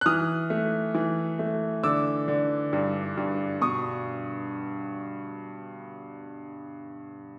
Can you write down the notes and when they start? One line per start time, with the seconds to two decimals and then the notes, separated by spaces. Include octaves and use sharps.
0.01 F#6
0.06 E3 D#6 F6
0.50 A3
0.95 E3
1.39 A3
1.83 D3 D6 E6
2.28 D3
2.73 G2
3.17 G2
3.61 B2 C#6 D#6